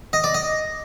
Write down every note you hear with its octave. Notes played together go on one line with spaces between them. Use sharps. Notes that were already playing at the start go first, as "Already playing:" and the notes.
D#5
D5
D#5